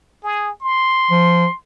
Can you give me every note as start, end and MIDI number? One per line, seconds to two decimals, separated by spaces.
0.23 0.51 68
0.61 1.55 84
1.11 1.46 53